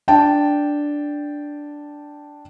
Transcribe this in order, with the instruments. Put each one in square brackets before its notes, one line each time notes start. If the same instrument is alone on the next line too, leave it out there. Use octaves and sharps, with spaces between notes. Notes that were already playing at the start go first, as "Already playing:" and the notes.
[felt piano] D4 G5 A5